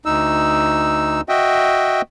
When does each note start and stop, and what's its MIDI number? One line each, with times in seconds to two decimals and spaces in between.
0.05 1.21 38
0.05 1.21 63
0.05 1.21 88
1.29 2.01 66
1.29 2.01 75
1.29 2.01 76
1.29 2.01 79